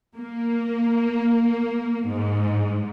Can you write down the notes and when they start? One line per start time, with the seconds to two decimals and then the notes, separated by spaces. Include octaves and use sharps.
0.17 A#3
2.07 G#2